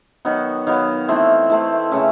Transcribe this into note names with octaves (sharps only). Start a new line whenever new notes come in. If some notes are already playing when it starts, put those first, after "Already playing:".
D#3 F#3 B3 F#5
D#3 F#3 B3 F5
E3 A3 C4
E3 A3 C4
C#3 E3 A3 C#4 E5